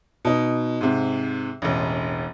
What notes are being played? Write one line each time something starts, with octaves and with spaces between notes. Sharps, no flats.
B2 D#4
G#2 C3
E1 A1